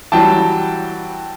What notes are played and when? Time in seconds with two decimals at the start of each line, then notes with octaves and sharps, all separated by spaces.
0.12 E3 F#3 G3 G5 A5